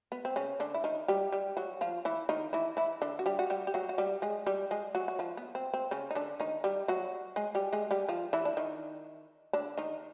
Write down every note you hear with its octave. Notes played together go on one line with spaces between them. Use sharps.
B3
C4
C#3 C#4
D3 D4
E4
D#3 D#4
G3 G4
G3 G4
F#3 F#4
F3 F4
E3 E4
D#3 D#4
E3 E4
E3 E4
D3 D4
F#4
G3 G4
F#4
G3 G4
G4
F#3 F#4
F#4
G3 G4
G#3 G#4
G3 G4
G#3 G#4
F#3 F#4
F#4
F3 F4
B3
C4
C4
C#3 C#4
D#4
D3 D4
D#3 D#4
G3 G4
F#3 F#4
G#3 G#4
G3 G4
G#3 G#4
G3 G4
F3 F4
E3 E4
D4
D#3 D#4
D3 D4
D#3 D#4